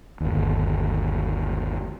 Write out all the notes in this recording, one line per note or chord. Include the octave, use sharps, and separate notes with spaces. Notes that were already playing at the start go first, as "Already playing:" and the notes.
G1 D#2